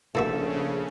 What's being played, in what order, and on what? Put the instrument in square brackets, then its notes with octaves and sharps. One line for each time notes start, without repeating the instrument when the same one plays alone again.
[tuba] A#1 [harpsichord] A2 A#3 F#4 [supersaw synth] C#3 [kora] A4 C5 E5